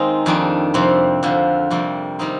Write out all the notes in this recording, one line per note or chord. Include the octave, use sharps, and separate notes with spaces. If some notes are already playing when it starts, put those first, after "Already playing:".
Already playing: D#3 G#3 A#3 C4 D#4
F2 D#3 G3 D4
F2 C3 G3 C4
F2 D3 F3
F2 C3 G3 A#3
D#3 G3 C4 D#4